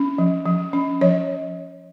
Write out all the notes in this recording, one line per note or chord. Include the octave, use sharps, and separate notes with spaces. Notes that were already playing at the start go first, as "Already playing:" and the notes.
Already playing: C#4
F3
F3
C#4
F3 C#5